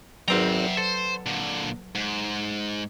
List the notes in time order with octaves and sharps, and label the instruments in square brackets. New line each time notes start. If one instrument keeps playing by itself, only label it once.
[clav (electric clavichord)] G#1 C4 A#5 [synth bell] F#3 B4 F#5 [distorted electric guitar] E5 G5
[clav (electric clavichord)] A4 [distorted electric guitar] C5
[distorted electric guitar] A#2 D3
G#2